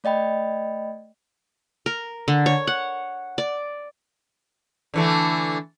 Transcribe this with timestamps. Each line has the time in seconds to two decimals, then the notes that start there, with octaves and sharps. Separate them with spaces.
0.04 A3 D5 D#5 G5 B5
1.86 A#4
2.28 D3
2.46 C#5
2.67 F#5
3.38 D5
4.94 D3 E3 A3